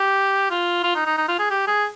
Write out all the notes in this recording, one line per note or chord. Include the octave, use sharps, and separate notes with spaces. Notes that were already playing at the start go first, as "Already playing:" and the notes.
Already playing: G4
F4
F4
D#4
D#4
D#4
F4
G#4
G4
G#4